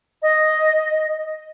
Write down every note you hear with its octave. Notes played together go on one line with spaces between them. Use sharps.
D#5